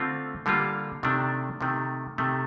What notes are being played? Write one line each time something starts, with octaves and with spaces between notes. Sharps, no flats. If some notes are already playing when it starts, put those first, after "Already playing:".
Already playing: D3 A3 C4 F4
D3 G3 A#3 F4
C3 D#3 A3 D4
C3 D#3 A3
C3 D#3 A3